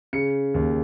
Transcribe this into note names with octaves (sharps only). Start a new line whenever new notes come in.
C#3 C#7
D#2